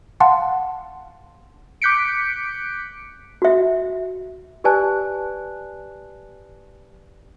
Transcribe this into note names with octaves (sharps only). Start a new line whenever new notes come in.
F5 F#5 A5 C6
D6 F#6 G6 B6 C#7 D7
F#4 E5
G4 B4 D5 G#5 A5 F#6